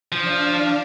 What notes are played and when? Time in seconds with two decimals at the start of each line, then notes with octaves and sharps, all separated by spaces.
0.12 F3 D4 F5